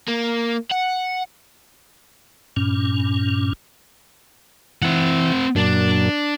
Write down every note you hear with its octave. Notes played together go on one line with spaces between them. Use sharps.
A#3
F#5
G2 A#2 C#4
E3 C4 F#5
F#2 A#2 D4